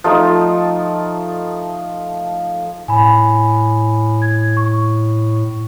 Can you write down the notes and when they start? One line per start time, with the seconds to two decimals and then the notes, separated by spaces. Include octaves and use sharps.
0.04 F3 A3 D#4
2.88 A2 G#5 B5
4.22 G#6
4.57 C#6